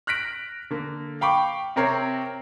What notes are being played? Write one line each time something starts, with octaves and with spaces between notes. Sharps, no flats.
F6 F#6 A#6 B6 D7
D3 A#3
F5 G5 B5 C#6 D6
C3 C4 A#4 C#5 C7